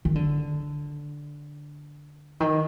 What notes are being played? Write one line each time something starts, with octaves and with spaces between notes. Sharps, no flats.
D#3
D3
D#3